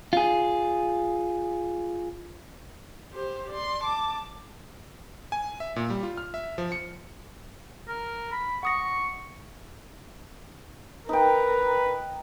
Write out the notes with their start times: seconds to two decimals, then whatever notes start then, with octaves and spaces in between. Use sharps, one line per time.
0.13 F4 G#4
3.13 G4 C5
3.51 D5 C6
3.84 A5 D6
5.32 G#5
5.60 E5
5.76 A#2
5.90 G3
6.03 F4
6.18 F6
6.34 E5
6.58 F3
6.72 C#7
7.88 A#4
8.32 B5
8.63 F#5 C#6 D#6 A#6
11.09 D#4 A#4 B4 G5